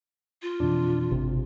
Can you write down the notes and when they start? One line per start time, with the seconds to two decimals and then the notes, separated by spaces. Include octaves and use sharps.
0.43 F4
0.60 F2 B2 E3 D4
1.11 G#1 C3